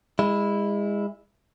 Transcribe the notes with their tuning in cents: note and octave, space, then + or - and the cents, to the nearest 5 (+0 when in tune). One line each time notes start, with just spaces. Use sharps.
G#3 -30 E4 +0